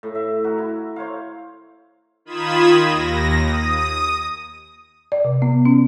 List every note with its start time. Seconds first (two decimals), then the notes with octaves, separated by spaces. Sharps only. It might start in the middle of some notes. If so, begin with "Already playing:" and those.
0.03 A2
0.15 E5
0.44 F#4 A#4
0.58 E4
0.96 C5 C#5 F5
2.25 D#3 F4 B5 D#6 G#6 E7
2.85 D#2 A#6
3.39 D#6
5.12 D5
5.25 C3
5.42 B3
5.65 C#4